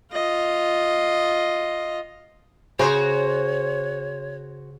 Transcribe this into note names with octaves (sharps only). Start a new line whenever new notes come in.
F4 D#5
C#3 F#4 C5 C#5